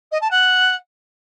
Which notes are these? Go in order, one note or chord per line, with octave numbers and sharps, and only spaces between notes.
D#5
A5
F#5